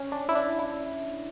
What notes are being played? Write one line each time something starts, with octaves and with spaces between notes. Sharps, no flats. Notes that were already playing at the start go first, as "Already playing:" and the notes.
Already playing: C#4
D4
E4
D4
E4